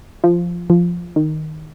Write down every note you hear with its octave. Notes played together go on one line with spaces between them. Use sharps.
F3
F3
D#3